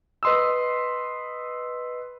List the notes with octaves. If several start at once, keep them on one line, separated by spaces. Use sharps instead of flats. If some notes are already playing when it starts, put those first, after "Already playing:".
B4 D#5 C6 D#6 E6